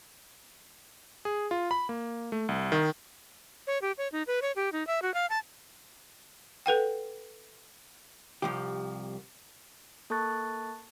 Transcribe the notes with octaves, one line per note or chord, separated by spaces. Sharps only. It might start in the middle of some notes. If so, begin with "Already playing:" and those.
G#4
F4
B5
A#3
A3
C2
D#3
C#5
G4
C#5
D#4
B4
C#5
G4
D#4
E5
F#4
F5
A5
A4 B4 F#5 G5
C2 F3 G4
A#3 A4 A5 C#6 F#6 A6